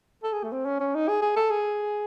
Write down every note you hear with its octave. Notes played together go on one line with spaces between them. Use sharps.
A4
G#4
A3
C4
C#4
C#4
D#4
G#4
G#4
A4
G#4